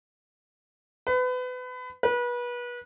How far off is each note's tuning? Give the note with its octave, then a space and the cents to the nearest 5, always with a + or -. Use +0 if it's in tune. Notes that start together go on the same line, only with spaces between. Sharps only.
B4 +30
B4 -30